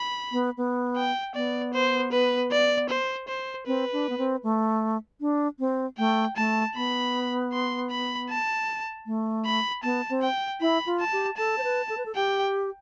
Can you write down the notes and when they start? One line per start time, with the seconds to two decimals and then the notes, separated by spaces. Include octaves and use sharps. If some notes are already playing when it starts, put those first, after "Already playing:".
Already playing: B5
0.32 B3
0.57 B3
0.97 G5
1.35 B3 D5
1.74 C5
2.12 B4
2.51 D5
2.89 C5
3.28 C5
3.67 C4 B4
3.92 D4
4.09 B3
4.18 C4
4.43 A3
5.21 D4
5.59 C4
5.98 A3 G5
6.36 A3 A5
6.75 B3 B5
7.52 C6
7.90 B5
8.29 A5
9.06 A3
9.46 B5
9.83 B3 A5
10.09 C4
10.22 G5
10.61 E4 B5
10.86 F4
11.00 A5
11.12 G4
11.37 A4 A5
11.58 C5
11.64 B4
11.89 A4
11.97 B4
12.06 A4
12.15 G4 G5